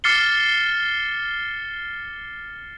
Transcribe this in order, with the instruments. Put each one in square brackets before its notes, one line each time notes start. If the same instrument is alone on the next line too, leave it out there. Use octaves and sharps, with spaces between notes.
[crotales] D6 F6 A6 C7 C#7 G7